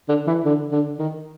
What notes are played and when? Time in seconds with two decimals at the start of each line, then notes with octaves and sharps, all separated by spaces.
0.09 D3
0.27 E3
0.45 D3
0.72 D3
0.99 D#3